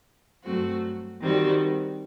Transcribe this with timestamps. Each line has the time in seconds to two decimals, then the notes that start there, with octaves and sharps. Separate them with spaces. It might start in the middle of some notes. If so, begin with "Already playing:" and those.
0.44 G2 F#3 A3 C4 F#4
1.21 D#3 G3 C4 F#4